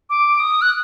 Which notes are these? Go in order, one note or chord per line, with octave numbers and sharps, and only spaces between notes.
D6
D#6
F#6